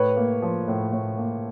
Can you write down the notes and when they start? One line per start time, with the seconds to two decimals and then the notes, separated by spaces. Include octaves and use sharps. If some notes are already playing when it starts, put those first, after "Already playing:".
Already playing: A2 B4 C#5
0.17 A#3
0.42 F3
0.68 A2
0.93 A2
1.17 A#3